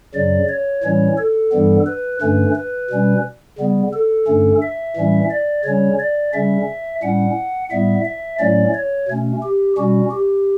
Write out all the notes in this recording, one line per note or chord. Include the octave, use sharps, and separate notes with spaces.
F#2 C#3 F#3 D5
C#5
A2 E3 G3 C#4 C#5
A4
G2 E3 G3 B3
B4
G2 D3 A3 C#4 B4
B4
B2 G3 C#4
C#3 G3 B3
A4
G2 D3 A3 C#4
E5
A2 E3 G3 C#4
D5
C#3 G3 C#4 C#5
D5
C#3 G3 C#4 E5
A2 G3 C#4 F#5
A2 G3 B3 E5
E5
A2 F#3 A3 C#4 D5
C#5
B2 A3 C#4
G4
B2 G3 C#4 F#4
G4